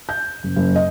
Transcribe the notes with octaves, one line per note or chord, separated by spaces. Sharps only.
G6
F#1
F#1
D#5